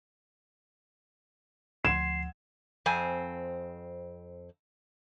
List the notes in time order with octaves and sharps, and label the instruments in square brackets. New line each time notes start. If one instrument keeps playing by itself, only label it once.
[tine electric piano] D2 F3 [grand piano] F#5 C6 G#6 [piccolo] C7 [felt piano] E7
[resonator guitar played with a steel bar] F2 C4 G#5